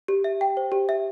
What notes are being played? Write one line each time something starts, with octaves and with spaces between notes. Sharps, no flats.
G4
E5
G5
C5
G4
E5